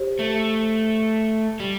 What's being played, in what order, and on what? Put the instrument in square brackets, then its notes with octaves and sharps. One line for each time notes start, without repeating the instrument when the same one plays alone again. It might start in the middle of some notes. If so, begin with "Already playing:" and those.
Already playing: [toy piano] G4 C5
[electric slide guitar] A3
G3